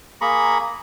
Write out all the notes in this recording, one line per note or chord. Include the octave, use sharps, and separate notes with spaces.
A#3 G#4 A#5 B5 C#6